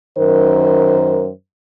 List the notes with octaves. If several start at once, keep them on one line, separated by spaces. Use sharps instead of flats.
F#2 D#3 A#4 C5